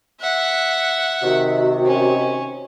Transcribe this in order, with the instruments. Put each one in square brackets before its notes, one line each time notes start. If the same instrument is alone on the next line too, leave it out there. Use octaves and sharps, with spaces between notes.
[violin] E5 F#5
[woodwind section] C3 D#3 [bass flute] F#4
[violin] C#4